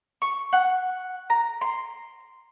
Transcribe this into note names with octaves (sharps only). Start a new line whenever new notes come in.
C#6
F#5
A#5
C6